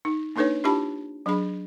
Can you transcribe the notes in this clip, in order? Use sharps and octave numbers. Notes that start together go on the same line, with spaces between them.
D#4
A#3 D4 D#4 A4 B4 C#5
D4 E4 F4 G4 A5 B5
F#3 D4 G#4 B5